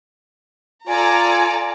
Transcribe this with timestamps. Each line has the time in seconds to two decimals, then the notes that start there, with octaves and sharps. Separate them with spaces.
0.88 F4 A4 D5 G#5 A#5